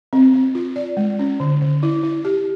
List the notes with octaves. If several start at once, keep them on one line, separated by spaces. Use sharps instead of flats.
C4
C4
F4
D5
G#3
C#4
D3
D3
E4
E4
G4